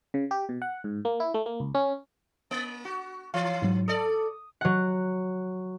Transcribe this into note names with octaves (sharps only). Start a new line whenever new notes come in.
C#3
G4
B2
F#5
G#2
A#3
E4
A3
A#3
C#2
C#4
A#3
F#4
E3 F5
G#2 F#3
A4 D5 D#6
F#3 F#5